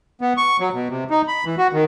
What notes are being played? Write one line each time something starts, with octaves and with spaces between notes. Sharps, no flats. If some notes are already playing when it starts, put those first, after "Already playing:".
B3
C#6
F#3
B2
C3
D#4
B5
E3
F#4
D#3